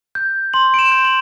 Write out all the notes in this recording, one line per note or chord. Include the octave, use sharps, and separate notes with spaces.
G6
C6 F#7
D7
E7
G6
F#7